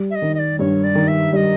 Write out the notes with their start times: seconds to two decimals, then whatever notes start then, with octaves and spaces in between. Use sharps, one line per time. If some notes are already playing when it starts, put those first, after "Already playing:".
Already playing: G3
0.10 E5
0.15 D#5
0.22 D#3
0.34 D#5
0.39 D5
0.59 G2 C#5
0.83 D5
0.95 D#3
1.08 E5
1.32 G3 D#5 E5